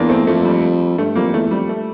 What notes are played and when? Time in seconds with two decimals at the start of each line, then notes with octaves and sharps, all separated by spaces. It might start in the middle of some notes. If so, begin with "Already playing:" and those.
Already playing: E2 A#3 D4
0.09 A3 C4
0.27 F2 A3
0.45 G3
0.98 G2 A3
1.15 F2 G3 A#3
1.34 E2 A3
1.51 F2 G3
1.69 A3